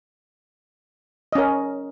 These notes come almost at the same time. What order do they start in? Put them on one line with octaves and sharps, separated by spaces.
D#5 C#4 A#4